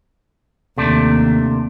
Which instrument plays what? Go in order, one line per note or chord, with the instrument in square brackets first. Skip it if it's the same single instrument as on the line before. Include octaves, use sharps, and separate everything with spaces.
[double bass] D#2 [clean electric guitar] C3 A3 D4